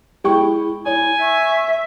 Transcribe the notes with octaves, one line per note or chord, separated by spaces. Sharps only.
G#3 E4 G5 C#6
E4 C#5 G#5
E5 C#6